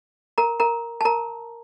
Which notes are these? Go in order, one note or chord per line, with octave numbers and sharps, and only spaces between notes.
A#4 A#5
A#4 A#5
A5
A#4 A#5